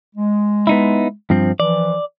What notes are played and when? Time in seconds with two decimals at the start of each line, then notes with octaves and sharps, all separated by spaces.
0.16 G#3
0.67 B3 D#4 E4
1.30 G2 F3 C4
1.60 E3 F3 D5